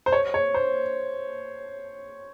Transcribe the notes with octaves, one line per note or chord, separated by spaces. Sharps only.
C5
C#5
C#5
C5